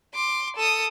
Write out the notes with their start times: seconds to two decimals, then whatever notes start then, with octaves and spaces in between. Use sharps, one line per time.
0.14 C6 D6
0.56 A4 D#6